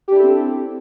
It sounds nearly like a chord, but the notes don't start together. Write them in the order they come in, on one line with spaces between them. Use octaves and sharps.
G4 D4 E4 A4 C4